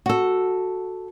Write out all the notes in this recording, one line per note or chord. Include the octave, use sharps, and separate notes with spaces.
F#4 A4